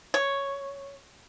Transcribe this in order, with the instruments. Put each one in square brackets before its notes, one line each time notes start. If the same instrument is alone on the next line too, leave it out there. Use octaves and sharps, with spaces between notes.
[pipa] C#5